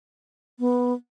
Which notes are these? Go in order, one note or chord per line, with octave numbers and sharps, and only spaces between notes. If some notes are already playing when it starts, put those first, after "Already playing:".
B3